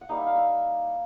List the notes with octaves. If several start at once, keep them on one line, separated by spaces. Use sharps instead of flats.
F#5
G3 A#3 D#4 F5
E5
F5
E5